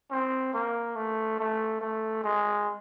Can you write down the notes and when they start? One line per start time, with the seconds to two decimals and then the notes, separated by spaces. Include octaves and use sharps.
0.11 C4
0.54 A#3
0.96 A3
1.39 A3
1.81 A3
2.24 G#3